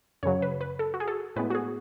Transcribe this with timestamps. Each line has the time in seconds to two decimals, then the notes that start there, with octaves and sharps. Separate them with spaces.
0.23 F#2 C#3 F#3 C#5
0.42 B4
0.61 B4
0.79 A4
0.94 F#4
1.00 G#4
1.08 A4
1.36 A2 G#3 B3 B4
1.50 F#4
1.55 G#4